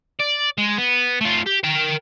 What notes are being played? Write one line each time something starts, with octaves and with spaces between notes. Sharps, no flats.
D5
G#3
B3
A3 F4
G4
A#4 G5